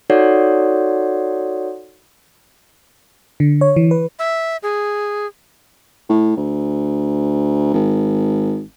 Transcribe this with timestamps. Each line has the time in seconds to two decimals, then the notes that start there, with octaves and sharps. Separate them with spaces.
0.10 D#4 F#4 A4 C#5 D5 F#5
3.40 D3
3.61 C#5
3.76 E3
3.91 B4
4.19 E5
4.63 G#4
6.09 A2
6.37 D2
7.74 G#1